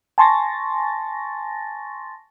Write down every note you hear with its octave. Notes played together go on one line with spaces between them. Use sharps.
G#5 A5 C6 C#6 A6 A#6